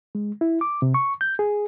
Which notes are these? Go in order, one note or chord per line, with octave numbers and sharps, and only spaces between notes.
G#3
E4
D6
C3
C#6
G6
G#4